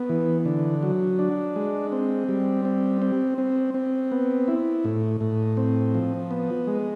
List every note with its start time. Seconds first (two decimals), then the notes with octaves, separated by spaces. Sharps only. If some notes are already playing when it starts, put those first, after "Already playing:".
Already playing: B3
0.09 E3
0.45 D3
0.83 F#3
1.19 D4
1.56 G#3
1.92 C4
2.29 G3
2.65 C4
3.02 C4
3.38 C4
3.74 C4
4.12 B3
4.48 E4
4.85 A2
5.21 A2
5.57 C4
5.95 F3
6.31 B3
6.67 G#3